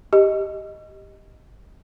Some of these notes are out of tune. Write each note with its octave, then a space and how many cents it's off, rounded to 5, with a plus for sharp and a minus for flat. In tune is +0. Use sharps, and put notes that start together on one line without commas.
G4 +0 D#5 +5